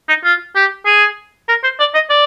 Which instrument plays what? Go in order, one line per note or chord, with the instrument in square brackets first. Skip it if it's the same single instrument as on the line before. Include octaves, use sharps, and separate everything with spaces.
[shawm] D#4
F4
G4
G#4
A#4
C5
D5
D#5
D5